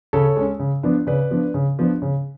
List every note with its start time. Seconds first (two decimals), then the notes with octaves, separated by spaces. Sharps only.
0.13 C#3 A4 C#5
0.36 G#3 C#4
0.60 C#3
0.83 F3 B3 D4
1.07 C#3 B4 D5
1.31 F3 B3 D4
1.54 C#3
1.79 F3 B3 D4
2.02 C#3